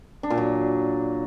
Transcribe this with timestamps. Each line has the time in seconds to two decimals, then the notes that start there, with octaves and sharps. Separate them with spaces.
0.23 D4
0.30 A#2
0.38 F#3